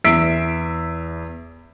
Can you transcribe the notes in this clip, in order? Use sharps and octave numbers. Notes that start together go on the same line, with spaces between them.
E2 E5 E6 B6 C7 D7